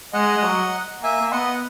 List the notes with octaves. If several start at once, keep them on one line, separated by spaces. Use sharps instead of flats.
G#3 D#5 F#5
G#3
F#3
A#3 E5 G#5
A#3
B3 D#5 F#5